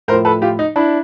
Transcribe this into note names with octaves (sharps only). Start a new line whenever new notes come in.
A2 F3 A#4 C5
A4 B4
F4 G4
D#4
D4 E4